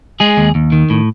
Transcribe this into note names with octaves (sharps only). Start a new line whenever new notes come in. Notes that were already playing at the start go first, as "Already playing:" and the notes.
G#3 G#4
D#2
D#2
D#3
A2